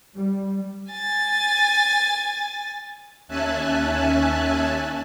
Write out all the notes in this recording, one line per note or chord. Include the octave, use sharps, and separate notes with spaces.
G3
G#5 A6
D#2 C#4 E5 G#5 A5 F#6